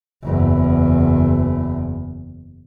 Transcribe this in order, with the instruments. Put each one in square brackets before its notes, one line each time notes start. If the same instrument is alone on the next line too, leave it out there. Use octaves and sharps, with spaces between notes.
[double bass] F#1 E2